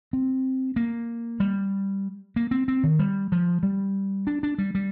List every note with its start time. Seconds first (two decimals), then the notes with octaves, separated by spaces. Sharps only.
0.13 C4
0.76 A#3
1.40 G3
2.36 A#3
2.51 C4
2.68 C4
2.83 D#3
2.99 G3
3.32 F3
3.63 G3
4.27 D4
4.43 D4
4.58 G3
4.75 G3